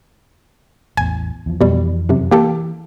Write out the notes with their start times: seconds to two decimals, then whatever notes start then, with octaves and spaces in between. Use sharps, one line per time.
0.97 A1 E2 G#5
1.46 E2 F3
1.61 F2 B2 E3 G3
2.09 F#2 C3
2.31 E3 A#3 G4 A4